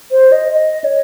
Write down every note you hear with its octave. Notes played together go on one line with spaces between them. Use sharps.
C5
D#5
D#5
C#5